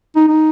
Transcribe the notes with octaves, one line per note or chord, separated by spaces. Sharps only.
D#4
D#4